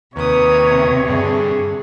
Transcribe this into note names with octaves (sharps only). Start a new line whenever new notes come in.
D#2 C3 B4 C#5 D#6
G2 D3 G#4